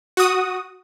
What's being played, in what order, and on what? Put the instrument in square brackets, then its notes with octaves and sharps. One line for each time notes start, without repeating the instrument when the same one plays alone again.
[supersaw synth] F#4 D#6